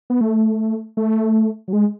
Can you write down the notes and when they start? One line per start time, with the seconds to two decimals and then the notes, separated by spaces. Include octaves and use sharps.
0.10 B3
0.21 A3
0.97 A3
1.68 F#3
1.73 G#3